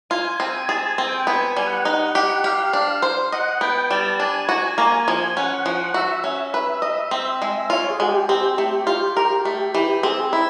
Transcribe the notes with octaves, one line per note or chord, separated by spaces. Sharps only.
F4 G#5
C4
G#4 A5
G#5
C4
G5
B3 G#5
G#5
G3
F#5
D#4
G4
G4 F5
D4
C5
D#5 F#5
B3 G5
G3 A5
D4 G#5
F#4
A#3
F3
C#4 F#5
F3
F#4 E5
C#4
B4 E5
D#5
C4
G#3
F4 C#5
G#4
G#3 F#4
G4
C4
A3
F4
A#4
A3 G4
E3
C4 G#4
E4